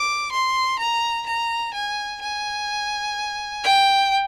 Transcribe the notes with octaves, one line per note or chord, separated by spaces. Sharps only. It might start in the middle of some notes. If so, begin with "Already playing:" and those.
Already playing: D6
C6
A#5
A#5
G#5
G#5
G5